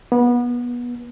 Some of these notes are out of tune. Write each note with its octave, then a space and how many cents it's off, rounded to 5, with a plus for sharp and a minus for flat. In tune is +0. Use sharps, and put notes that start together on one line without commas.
B3 -25